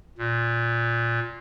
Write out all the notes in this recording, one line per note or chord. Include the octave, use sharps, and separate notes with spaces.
A#2